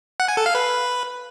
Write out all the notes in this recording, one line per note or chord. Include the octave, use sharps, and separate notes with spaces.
F#5
G#5
A4
F5
B4